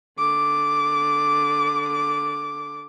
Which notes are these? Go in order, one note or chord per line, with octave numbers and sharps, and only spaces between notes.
D3 D6